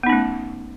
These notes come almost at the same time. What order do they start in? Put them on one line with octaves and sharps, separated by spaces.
B3 D#4 C#4 A3